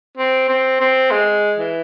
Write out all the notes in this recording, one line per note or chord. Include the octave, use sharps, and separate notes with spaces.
C4
C4
C4
G#3
E3